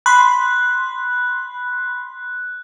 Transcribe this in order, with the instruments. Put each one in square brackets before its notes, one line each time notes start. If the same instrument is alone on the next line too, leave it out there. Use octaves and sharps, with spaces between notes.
[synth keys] B5 C6 [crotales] F#6